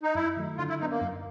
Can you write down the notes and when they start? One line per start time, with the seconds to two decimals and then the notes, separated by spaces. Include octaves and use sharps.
0.03 D#4
0.15 F#2 E4
0.37 D#3 F#3 A3
0.58 D3 F4
0.69 E4
0.79 F#3 B3 D4 D#4
0.91 A#3
1.01 F#2